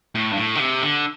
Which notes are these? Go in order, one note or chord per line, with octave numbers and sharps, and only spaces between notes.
A2
G2
A2
D3
C3
D3